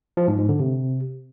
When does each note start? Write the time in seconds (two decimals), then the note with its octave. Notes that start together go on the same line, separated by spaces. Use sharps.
0.17 F3
0.28 G#2
0.38 G#2
0.49 D3
0.60 C3